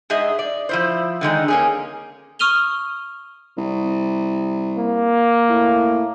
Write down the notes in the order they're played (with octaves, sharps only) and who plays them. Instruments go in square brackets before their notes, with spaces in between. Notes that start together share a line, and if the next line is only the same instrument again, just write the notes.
[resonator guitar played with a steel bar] G#2 G#4 D#5 E5
D5
F3 E4 C5
D3 D#3 G#3 D#4
A#3 C#4 G#4
[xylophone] C#6 D#6 F6 D#7 F7 G7
[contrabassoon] C2
[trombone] A#3
[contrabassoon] A2